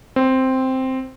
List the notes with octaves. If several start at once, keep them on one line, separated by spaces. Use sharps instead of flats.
C4